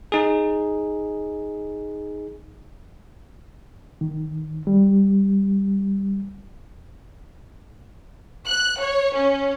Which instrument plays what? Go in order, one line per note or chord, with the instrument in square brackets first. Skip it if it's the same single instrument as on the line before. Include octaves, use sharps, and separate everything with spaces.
[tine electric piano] D#4 G#4
[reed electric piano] D#3
G3
[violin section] F#6
C#5
C#4